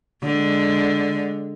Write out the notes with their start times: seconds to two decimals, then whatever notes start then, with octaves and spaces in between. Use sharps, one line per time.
0.23 D3 G#3